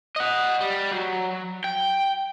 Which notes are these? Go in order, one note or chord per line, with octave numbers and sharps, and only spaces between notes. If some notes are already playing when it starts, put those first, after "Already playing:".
D#5 F#5
G3
F#3
G5